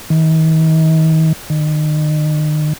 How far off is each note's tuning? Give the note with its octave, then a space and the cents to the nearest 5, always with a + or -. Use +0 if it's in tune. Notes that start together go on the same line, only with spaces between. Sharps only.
D#3 +40
D#3 -35